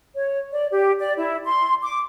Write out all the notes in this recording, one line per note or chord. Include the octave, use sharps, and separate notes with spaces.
C#5
D5
G4
D5
E4
C6
D6